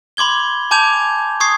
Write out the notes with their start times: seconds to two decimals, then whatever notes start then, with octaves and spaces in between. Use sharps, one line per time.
0.17 B5 C6 D6 G#6 G7
0.71 G#5 A5 D6 G6 G#6 F7
1.40 C#6 D#6 G#6 C7